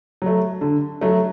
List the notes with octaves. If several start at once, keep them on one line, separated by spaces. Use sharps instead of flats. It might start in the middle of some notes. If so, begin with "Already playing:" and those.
F#3 A3
D3
F#3 A3